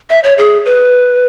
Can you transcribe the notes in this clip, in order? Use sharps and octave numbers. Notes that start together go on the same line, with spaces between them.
E5
C#5
G#4
B4